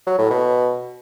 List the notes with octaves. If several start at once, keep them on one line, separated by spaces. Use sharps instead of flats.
F#3
A2
B2